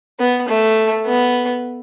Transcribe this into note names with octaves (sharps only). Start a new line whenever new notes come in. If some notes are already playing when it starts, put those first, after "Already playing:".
B3
A3
B3